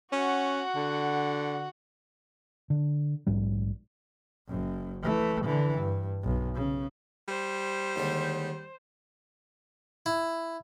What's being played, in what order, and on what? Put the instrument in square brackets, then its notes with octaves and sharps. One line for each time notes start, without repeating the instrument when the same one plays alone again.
[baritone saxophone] C#4 [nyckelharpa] F#4 F#5
[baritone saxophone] D3
[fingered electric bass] D3
A#1 G#2 G3
[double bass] F#1 F#2
E3 A3
D3 E3
G2
B1
C#3
[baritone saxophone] G3 [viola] C5
[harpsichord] D#2 D3 G#3
E4